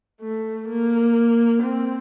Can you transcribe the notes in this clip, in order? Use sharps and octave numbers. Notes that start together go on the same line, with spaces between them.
A3
A#3
C4